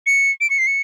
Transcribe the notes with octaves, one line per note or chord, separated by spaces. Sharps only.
C#7
D7
C#7
C7
C#7